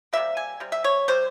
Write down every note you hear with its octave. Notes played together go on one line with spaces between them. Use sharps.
C3 G3 A#3 E5
G#5
C3 G3
E5
C#5
C3 G3 C5